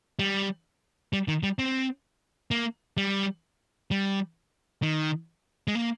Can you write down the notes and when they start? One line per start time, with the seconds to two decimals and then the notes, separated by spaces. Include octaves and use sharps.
0.19 G3
1.13 G3
1.28 D#3
1.43 G3
1.59 C4
2.51 A#3
2.97 G3
3.91 G3
4.83 D#3
5.68 G#3
5.75 A#3